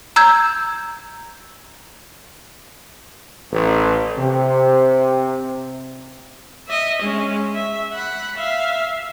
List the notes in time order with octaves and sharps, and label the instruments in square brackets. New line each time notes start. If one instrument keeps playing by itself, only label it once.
[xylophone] A#5 E6 G6 G#6
[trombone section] A1
C3
[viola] D#5 E5
G#3 C#4
E5
F#5 B5
E5 F5